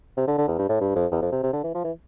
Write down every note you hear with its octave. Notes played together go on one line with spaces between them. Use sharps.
C3
D3
D3
E2
G2
A2
G2
F2
E2
F2
C3
C3
D3
E3
F3
E3